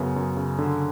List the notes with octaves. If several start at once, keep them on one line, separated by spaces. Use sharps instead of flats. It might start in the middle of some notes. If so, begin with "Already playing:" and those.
Already playing: F#2 C#3 B3
F#2
C#3
D3